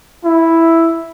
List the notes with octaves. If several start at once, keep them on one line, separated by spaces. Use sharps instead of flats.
E4